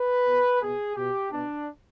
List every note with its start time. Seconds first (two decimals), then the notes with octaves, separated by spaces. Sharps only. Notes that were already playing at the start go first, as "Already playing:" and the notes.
Already playing: B4
0.27 B2
0.62 B2 G#4
0.96 B2 G4
1.31 B2 D4